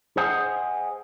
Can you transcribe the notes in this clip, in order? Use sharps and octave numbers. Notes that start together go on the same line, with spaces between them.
G#4 C5 D#5 F#5 G#5